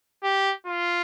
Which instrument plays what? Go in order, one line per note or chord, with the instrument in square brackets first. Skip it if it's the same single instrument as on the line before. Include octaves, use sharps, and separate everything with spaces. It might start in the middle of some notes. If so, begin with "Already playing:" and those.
[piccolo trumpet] G4
F4